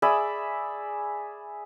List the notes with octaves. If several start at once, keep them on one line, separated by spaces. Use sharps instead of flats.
G#4 D5 E5 B5